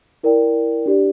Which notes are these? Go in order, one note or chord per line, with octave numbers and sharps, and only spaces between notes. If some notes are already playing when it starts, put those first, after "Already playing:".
E4 A#4 D5 G5
D4 G4 D5